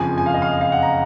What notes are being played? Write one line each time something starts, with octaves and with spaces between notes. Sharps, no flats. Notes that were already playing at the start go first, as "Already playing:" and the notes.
Already playing: F#1 F2 F3 G#5
G#5
F5
D#5
F5
F5
F#5
A#5